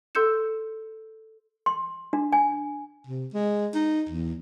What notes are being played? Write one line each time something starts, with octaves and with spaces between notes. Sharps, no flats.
A4 C6 E6 G6 C#7 E7
C6
D4
G#5
C3
G#3
D#4
E2